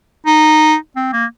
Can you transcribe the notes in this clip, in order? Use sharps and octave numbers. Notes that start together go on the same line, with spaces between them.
D#4
C4
A#3